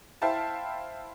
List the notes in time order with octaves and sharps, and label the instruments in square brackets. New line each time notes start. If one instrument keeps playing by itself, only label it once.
[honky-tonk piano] E4 C5 E5 F5 G5 A5